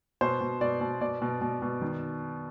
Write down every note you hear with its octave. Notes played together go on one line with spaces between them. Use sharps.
B2 C5
B2
B2 D5
B2
B2 D5
B2
B2
B2
D#3